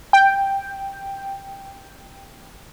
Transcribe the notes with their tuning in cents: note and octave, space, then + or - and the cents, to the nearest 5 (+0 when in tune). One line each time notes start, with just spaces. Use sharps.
G5 +5